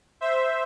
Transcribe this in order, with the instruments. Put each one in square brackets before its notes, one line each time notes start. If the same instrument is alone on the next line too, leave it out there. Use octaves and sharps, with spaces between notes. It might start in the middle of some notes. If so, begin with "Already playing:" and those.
[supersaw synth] C5 E5